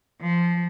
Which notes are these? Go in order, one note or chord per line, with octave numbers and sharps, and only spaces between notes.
F3